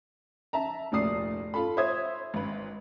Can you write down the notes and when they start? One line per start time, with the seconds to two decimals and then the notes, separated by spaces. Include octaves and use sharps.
0.53 E5 A5 A#5
0.92 F1 D2 A#2 D5 D#6 C7
1.54 F4 A4 B5
1.77 C5 C#5 E5 D#6 G#6
2.34 G#1 B4